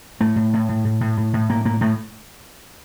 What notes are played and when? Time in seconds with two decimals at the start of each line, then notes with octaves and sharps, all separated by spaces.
0.20 A2 A3
0.36 A2
0.53 A2
0.69 A2
0.85 A2
1.01 A2
1.17 A2
1.33 A2
1.49 A2 A#3
1.65 A2 A#3
1.81 A2 A3